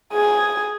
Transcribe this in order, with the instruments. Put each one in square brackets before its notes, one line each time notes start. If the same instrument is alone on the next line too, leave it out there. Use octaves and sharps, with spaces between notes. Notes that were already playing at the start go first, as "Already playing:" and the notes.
[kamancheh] G#4